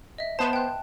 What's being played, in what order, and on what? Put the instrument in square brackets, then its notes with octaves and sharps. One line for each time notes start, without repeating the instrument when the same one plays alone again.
[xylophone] D#5 E5
[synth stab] B3 C5 [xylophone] A5 E7
[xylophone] G5 F#6